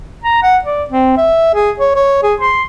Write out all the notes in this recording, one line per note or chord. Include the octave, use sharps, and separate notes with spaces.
A#5
F#5
D5
C4
E5
G#4
C#5
C#5
G#4
C6